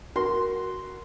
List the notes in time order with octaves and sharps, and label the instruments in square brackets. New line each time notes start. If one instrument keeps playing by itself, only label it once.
[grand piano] F#4 A#4 [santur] C6